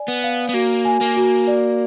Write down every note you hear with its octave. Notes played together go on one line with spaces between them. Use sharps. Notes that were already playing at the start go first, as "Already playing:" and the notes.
Already playing: D5 G#5
B3
F5
B3
A#3 F#4
G#5
A#3
F#4
D5